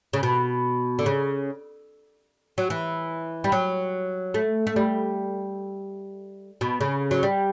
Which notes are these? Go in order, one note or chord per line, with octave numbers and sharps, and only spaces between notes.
C#3
B2
D3
C#3
F#3
E3
G3
F#3
A3
A3
G3
B2
C#3
F#3
G3